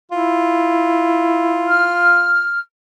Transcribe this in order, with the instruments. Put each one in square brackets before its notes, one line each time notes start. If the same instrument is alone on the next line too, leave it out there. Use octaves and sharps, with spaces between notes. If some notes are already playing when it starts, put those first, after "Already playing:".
[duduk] E4 [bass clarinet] F4
[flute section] F6